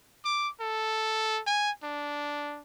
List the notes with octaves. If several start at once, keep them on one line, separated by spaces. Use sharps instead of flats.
D6
A4
G#5
D4